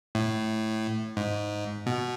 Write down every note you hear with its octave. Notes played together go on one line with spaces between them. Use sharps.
A2
G#2
B2